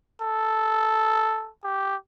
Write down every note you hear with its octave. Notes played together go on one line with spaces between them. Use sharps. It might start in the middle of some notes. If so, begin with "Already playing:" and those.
A4
G4